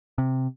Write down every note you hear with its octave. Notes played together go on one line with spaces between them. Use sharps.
C3